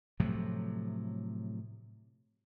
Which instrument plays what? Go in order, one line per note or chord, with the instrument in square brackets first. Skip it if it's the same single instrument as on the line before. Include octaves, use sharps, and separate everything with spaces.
[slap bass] A2 C3 F3 F#3